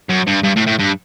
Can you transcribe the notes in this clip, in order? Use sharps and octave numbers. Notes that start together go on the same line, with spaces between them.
F#2
G2
G2
A2
A2
G2